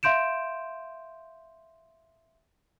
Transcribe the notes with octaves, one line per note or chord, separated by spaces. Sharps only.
E5 F5 C6 G6 D7 E7